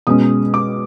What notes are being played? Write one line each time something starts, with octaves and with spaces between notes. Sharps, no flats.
B2 G#3 C#4 D#6
D6